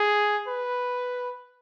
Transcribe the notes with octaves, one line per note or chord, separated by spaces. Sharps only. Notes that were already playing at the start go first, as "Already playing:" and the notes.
Already playing: G#4
B4